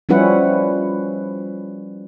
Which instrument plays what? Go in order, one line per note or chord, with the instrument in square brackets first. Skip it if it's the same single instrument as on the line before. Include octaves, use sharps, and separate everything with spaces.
[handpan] F3 G3 C#4 E4 B4 F#5